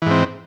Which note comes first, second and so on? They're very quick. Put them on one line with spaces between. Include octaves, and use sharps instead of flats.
E3 G#2 C4